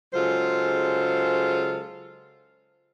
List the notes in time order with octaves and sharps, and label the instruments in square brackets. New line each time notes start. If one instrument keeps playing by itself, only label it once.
[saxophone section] C#3 F#3 G#3 F4 A4 C5